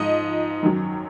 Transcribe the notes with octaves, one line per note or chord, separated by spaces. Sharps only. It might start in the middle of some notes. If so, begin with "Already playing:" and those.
Already playing: G#2 F3 D#5
F#2 D#3 F#3